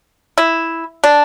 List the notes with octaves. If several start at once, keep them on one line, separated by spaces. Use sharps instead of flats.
E4
D4